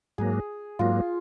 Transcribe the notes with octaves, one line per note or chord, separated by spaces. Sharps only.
G#2 F#3 A#3 G#4
G#2 F#3 A#3 F4